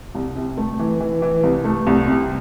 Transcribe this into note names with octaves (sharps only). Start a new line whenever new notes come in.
C2
C3
A3
E3
E3
E3
C2
A3
C2
C3